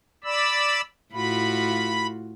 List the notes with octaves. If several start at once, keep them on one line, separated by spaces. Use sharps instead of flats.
D5 B5 E6
A2 F4 F#4 B5